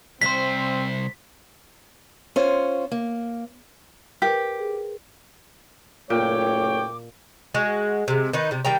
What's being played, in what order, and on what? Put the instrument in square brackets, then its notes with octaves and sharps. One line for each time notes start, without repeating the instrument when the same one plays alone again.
[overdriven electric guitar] C2 C5 [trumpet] C4 [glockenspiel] B6
[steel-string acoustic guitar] C#4 F4 C5
A#3
[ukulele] G4 [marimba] A#4 B4
[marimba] G#4
[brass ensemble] F#1 A3 C#5 [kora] A#2 [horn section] G5 [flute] D6
[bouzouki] G#3 F#4
C3 G#3
D#3 D#4 B4
C3 G3
D#3 G3 G5 A#5